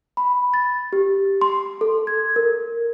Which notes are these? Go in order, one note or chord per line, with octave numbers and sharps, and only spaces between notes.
B5
A6
G4
C6
A4
G#6
A#4